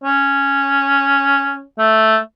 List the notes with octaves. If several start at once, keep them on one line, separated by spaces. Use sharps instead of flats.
C#4
A3